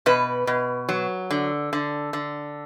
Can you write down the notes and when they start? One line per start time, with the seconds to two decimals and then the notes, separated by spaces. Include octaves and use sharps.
0.06 B2 B4
0.47 B2
0.89 F#3
1.31 D3
1.73 D3
2.13 D3